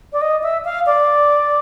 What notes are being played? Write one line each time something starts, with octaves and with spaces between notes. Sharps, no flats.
D5
D#5
E5
F5
D5